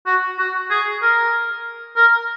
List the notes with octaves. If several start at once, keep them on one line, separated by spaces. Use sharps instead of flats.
F#4
F#4
G#4
A#4
A#4